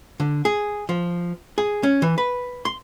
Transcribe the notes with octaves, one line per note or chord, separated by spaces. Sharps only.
D3
G#4
F3
G#4
C#4
E3
B4
C6